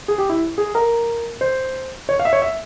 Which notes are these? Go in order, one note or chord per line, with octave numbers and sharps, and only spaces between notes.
G#4
G4
E4
G#4
A#4
C5
C#5
F5
E5
C#5
E5